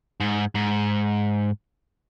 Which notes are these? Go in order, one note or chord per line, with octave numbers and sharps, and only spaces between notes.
G#2
G#2